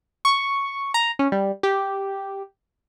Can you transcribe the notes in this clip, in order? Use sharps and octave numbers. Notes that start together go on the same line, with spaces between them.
C#6
A#5
C#4
G3
G4